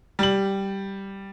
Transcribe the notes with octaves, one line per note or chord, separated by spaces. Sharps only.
G3 F#7